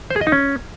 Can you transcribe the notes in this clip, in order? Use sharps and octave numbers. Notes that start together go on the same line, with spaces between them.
C5
G#4
D#5
D#4
C#4